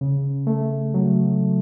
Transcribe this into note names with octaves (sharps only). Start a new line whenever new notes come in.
C#3
A3
F#3